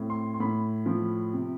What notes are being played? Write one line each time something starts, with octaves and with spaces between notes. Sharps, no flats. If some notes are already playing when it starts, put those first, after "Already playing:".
Already playing: A2 C4
C6
C6
A2 B5
F3
C3